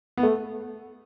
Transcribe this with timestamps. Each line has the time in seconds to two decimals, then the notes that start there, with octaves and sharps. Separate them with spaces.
0.17 B3
0.23 A3